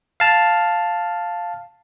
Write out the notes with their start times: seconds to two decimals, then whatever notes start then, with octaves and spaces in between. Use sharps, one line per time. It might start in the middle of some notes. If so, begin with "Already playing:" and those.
0.20 F5 A5 F6